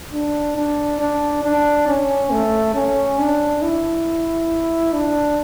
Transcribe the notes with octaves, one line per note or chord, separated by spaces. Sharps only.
D4
D4
D4
D4
C#4
A3
C#4
D4
E4
D4